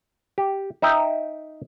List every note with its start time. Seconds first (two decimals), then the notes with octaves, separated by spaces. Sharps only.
0.38 G4
0.82 D#4 E5 G5